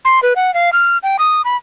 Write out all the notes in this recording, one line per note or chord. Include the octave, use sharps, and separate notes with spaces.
C6
B4
F#5
F5
F6
G5
D#6
B5